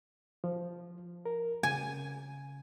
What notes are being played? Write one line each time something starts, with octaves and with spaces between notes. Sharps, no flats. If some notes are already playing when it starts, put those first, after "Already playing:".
F3
A#4
C#3 G#5